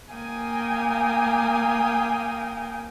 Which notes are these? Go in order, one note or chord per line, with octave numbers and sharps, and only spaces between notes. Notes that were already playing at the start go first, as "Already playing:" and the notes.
A#3 F5 G5 G#5 D#6